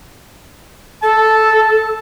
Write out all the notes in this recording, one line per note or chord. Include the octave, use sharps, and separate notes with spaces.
A4 A5